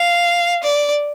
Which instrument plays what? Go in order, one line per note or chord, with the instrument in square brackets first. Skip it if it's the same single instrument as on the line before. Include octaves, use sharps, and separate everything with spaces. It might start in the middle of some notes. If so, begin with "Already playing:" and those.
Already playing: [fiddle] F5
D5